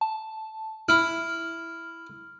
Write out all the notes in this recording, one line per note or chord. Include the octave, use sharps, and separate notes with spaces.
A5
E4 F6